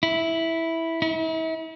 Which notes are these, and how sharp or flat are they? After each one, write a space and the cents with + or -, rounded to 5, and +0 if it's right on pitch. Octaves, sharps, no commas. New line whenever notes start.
E4 -5
E4 -40